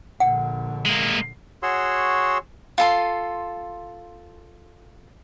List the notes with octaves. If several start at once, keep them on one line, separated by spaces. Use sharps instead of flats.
A#1 D3 F#5
G#3 A#3
F#4 G#4 C#5 F#5 C6 E6
F4 A4 C6